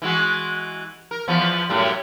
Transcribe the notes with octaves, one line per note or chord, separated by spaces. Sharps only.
E3 G#3 F#4
A#4
E2 F3 B3
F#2 A2 G3